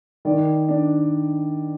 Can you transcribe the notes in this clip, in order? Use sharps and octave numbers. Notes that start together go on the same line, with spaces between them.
D#3 D5
D4